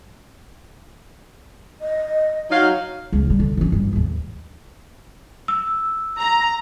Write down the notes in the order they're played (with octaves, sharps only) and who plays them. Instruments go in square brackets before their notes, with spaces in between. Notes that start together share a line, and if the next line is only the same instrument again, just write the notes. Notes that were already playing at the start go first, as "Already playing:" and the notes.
[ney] D#5
[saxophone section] F#3 D#4 F5
[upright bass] C#2
D#3 G3
D3
E3 C#4
G2
D#2 G#2
[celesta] E6
[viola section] A#5